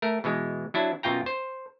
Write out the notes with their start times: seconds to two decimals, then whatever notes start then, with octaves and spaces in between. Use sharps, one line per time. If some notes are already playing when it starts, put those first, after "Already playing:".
0.02 A3 A#4
0.24 B2 E3 G#3
0.74 F#3 D4 E4
1.03 F#2 B2 F4 G5 A#5
1.26 C5